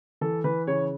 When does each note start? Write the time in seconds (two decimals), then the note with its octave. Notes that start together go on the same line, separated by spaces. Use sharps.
0.21 E3 A4
0.44 E3 B4
0.67 C#3 C#5